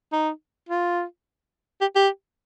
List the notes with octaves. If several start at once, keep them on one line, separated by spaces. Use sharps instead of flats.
D#4
F4
G4
G4